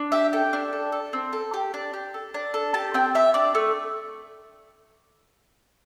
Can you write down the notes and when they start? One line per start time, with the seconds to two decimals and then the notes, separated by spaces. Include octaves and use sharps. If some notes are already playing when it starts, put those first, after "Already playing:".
Already playing: D4
0.12 G4 E5
0.33 A4 G5
0.53 D4
0.73 A4
0.92 A4
1.13 C4
1.33 A4
1.54 G4
1.74 D4
1.94 G4
2.14 A4
2.34 D4
2.54 A4
2.74 G4 A5
2.94 C4 G5
3.15 G4 E5
3.34 D4 D5
3.55 A3